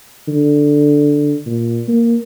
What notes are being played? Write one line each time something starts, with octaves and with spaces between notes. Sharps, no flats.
D3
A#2
A#3